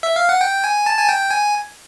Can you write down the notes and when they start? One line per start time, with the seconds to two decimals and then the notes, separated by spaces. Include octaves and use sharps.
0.03 E5
0.16 F5
0.29 F#5
0.41 G5
0.64 G#5
0.86 A5
0.99 G#5
1.09 G5
1.31 G#5